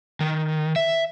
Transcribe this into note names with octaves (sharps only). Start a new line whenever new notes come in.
D#3
E5